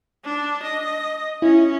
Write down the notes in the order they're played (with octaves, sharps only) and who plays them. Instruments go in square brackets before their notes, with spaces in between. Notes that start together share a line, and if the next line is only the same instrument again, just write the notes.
[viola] D4
D#5
[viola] C#4 [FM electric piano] E4